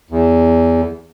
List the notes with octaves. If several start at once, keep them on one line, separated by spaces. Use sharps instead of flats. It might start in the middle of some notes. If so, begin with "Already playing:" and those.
E2